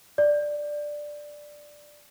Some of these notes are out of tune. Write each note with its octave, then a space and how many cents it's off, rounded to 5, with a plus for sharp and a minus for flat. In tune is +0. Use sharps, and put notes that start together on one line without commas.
D5 +5